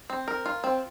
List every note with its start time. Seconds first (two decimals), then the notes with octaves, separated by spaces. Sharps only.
0.10 C4
0.28 A#4
0.46 F4
0.64 C4